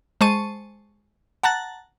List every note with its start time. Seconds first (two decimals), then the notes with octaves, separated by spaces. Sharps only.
0.21 G#3 C5 A5 C#6 D#7
1.43 F#5 A5 A#5 F#6 A6